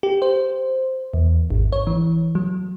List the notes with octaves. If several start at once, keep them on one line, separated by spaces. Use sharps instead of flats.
G4
C5
E2
G#1
C#5
E3
F#3